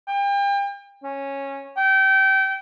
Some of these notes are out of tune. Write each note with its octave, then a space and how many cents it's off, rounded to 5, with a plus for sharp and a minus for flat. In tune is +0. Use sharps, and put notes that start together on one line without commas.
G5 +35
C#4 -10
G5 -30